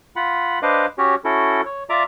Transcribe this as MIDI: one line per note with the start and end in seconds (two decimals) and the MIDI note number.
0.16 0.59 65
0.16 0.59 78
0.16 0.59 83
0.63 0.86 62
0.63 0.86 71
0.63 0.86 72
0.63 0.86 75
0.63 0.86 77
0.63 0.86 86
0.98 1.15 61
0.98 1.15 66
0.98 1.15 67
0.98 1.15 73
1.24 1.61 61
1.24 1.61 64
1.24 1.61 66
1.24 1.61 69
1.66 1.84 73
1.90 2.04 65
1.90 2.04 74
1.90 2.04 76
1.90 2.04 82
1.90 2.04 86